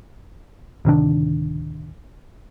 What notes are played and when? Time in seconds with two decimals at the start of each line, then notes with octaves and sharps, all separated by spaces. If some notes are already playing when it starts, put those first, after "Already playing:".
0.85 D1 C3 D#3 D4